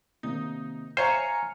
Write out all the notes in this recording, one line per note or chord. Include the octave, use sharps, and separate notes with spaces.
C3 D#3 A#3 D#4
C5 C#5 E5 F5 G#5 A#5 C6 C#7